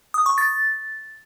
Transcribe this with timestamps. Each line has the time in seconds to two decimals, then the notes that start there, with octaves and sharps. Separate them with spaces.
0.14 D#6
0.26 C#6
0.38 A6